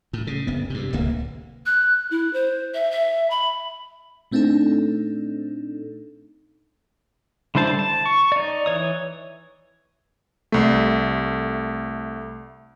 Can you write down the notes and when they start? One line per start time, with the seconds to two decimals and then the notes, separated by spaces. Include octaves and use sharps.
0.13 A2
0.27 C#3
0.47 F#1 B3
0.70 G2 C3
0.93 D1 C#2 A#3
1.66 F#6
2.11 E4
2.33 C5
2.74 E5
2.91 E5
3.30 B5
4.31 A#2 A3 C4 D4 D#4 A4
7.55 D3 G3 E4 C5 A5
7.79 A5
8.06 C#6
8.32 D#4 D5
8.66 E3 C#5 D#6
10.52 C2 A3